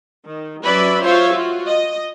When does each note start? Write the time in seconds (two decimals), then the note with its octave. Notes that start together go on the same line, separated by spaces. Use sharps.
0.24 D#3
0.63 F#3 C#4 B4 D5 E5 B5
1.02 F4 C5 C#5 E5 F5
1.33 F4 F#4
1.66 D#5